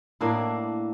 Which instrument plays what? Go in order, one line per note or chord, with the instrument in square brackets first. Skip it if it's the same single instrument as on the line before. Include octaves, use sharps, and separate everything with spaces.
[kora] A2 A#3 D4 E4